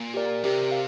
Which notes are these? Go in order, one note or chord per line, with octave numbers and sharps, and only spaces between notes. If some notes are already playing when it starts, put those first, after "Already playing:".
Already playing: A#2
G4 A#4 D5
C3 G4 A#4 D5
F5